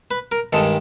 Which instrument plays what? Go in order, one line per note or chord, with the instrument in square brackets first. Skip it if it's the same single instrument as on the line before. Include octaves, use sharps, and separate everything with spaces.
[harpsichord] B4
A#4
G2 D#3 G#3 A4